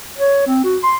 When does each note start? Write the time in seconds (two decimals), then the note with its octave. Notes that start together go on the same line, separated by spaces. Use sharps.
0.18 C#5
0.47 C4
0.64 F#4
0.83 C6